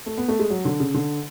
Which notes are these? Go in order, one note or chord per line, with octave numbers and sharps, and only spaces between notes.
A3
B3
A3
G#3
F#3
D3
C#3
D3